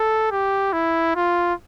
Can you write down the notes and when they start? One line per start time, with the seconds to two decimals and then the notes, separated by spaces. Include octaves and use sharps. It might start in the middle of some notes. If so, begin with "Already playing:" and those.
Already playing: A4
0.31 G4
0.73 E4
1.15 F4